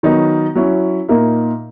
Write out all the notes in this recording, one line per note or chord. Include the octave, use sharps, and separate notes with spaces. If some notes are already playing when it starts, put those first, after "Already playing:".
D#3 F#3 B3 D#4
F#3 C#4 E4
A#2 A#3 D#4 A#4 E5